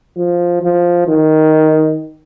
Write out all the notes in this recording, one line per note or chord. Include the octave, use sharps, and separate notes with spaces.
F3
F3
D#3